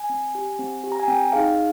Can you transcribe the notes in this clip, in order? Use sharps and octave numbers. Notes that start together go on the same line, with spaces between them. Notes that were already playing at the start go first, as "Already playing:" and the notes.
Already playing: G#5
C4
G4
C4
G4
A#5
G#5
C4 G5
D#4 G#4 F5